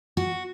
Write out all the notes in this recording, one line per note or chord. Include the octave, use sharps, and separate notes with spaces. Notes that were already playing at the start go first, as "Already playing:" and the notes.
F#4